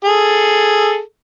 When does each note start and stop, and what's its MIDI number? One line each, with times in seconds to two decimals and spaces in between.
0.04 1.00 68
0.04 1.00 69